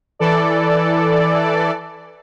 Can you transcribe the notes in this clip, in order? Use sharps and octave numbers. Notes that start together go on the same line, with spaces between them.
E3 A4 D5